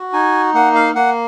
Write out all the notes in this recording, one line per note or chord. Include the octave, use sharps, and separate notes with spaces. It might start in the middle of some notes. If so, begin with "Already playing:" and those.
Already playing: F#4
D#4 G#5
A#3 F#5
F5
A#3 F#5